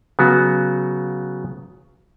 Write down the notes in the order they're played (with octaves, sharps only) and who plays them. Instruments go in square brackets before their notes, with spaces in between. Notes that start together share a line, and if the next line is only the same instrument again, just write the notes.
[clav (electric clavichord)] C#3 F#3 B3 F#4